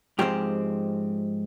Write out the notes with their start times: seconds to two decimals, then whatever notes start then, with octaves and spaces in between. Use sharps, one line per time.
0.19 G#2 F3 G#3 C4 G4